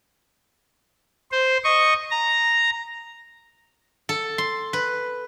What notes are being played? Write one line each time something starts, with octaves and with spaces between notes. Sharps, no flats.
C5
D#5 C#6
A#5
A4
C6
B4